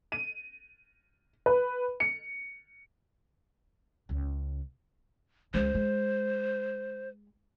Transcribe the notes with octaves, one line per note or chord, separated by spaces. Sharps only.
D#7
B4
C#7
C#2 C#3
C#2 G#3 C5
G#3